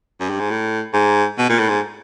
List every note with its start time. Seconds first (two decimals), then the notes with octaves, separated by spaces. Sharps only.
0.20 F#2
0.30 G2
0.40 G#2
0.50 A2
0.94 G#2
1.38 B2
1.49 A#2
1.59 A2
1.69 G#2